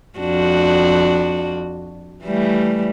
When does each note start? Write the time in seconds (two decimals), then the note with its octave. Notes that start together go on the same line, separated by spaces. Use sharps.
0.19 F2 D4 F#4
2.24 E3 G3 A3